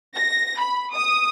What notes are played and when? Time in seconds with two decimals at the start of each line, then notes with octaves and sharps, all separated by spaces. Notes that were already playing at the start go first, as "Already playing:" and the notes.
0.16 A#6
0.59 B5
0.94 D#6